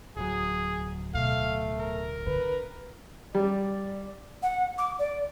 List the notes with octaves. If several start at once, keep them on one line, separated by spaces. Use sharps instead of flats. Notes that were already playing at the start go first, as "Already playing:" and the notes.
D1 F#3 G#4
B2 A3 F5
A#4
D3 B4
G3 D5
F#5
D6
D5